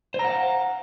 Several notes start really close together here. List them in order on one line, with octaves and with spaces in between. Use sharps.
C5 A#5 F#5 F5